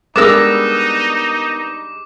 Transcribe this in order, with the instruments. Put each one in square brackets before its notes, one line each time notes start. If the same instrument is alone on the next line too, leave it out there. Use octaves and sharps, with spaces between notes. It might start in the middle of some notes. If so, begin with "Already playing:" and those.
[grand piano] G3 G#3 D4 [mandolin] B3 A#4 E6 [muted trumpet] D#4 [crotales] D6